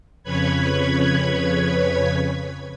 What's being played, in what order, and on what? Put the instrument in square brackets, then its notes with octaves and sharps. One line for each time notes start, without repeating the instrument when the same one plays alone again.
[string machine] F2 C#3 B4 C#5 B5 G#6